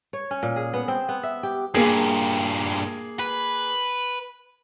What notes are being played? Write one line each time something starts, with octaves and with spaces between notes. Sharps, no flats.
C#5
C#4
A#2
G#4
B3
C4
B3
E5
G4
G2 A#2 A#3 G#4
B4